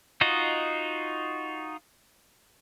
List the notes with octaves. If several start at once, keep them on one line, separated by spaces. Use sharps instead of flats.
D#4 F4 F#4 D#5